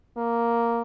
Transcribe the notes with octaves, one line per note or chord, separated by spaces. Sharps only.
A#3